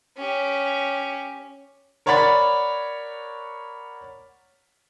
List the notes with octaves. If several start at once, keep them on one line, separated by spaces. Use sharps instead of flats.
C#4 G4
A#4 C#5 D5 F#5 B5 A6